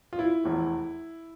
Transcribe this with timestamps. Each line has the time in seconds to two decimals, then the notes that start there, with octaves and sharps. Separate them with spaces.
0.13 F4
0.19 E4
0.44 F1 E2 E3